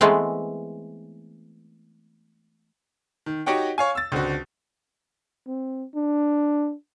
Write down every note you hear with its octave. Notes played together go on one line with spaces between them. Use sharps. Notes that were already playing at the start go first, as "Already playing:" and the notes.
E3 G#3 A3 B3 C4
D#3
D#4 F#4 G4 C#5 F#5 G5
C#5 F5 G#5
E6 A6
C#2 D3 C4 F#4
C4
D4